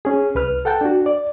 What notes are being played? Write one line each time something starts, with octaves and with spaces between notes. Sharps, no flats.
C#4 G#4
C2 B4 F6
A4 F#5 G5 A5
D4 F#4
D5